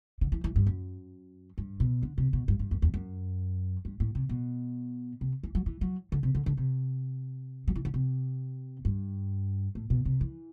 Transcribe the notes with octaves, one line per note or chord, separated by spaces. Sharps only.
D3
E3
E3
G2
F#2
G2
B2
D3
C3
B2
G2
G2
F#2
E2
F#2
G2
A2
C3
B2
C3
E3
F#3
E3
F#3
D3
C3
D3
D3
C3
F#3
E3
D3
C3
G2
A2
B2
C3
E3